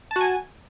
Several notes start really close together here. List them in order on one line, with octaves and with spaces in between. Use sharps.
A5 F#4 G#5